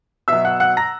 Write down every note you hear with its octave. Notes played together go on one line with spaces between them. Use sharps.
B2 F#3 E5 E6
F#5 F#6
F#5 F#6
A#5 A#6